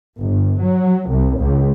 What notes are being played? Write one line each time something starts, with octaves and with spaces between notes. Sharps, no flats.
G1
F#3
C2
C#2